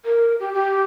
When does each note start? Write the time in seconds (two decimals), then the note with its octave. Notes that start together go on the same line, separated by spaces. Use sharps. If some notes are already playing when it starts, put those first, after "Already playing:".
0.05 A#4
0.40 G4
0.54 G4